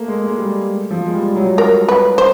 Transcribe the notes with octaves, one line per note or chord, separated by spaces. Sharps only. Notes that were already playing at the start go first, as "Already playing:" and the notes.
Already playing: A3 A#3
G#3
G#3
G3
F3
G#3
G3
F#3
A#4
B4
C5